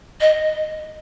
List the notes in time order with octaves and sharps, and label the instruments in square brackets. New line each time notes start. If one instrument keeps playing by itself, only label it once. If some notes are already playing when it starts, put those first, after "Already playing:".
[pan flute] D#5